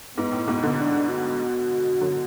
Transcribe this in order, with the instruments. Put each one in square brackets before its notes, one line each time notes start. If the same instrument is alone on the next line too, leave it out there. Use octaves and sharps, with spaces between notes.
[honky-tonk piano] G#2 [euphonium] B3
[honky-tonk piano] A2
G#2 B2
B2 D3
[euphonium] D4
F#4
[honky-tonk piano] D3 F#3